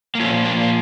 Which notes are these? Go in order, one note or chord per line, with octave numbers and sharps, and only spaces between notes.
A#3
A#2 F3 A3 C#4
A#3 D4
A#3